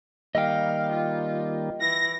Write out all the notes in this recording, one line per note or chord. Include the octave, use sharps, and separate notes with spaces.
D#3 G3 A#3 D#5 F5 G5
F4
E3 A#6